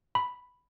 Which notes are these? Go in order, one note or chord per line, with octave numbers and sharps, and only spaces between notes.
B5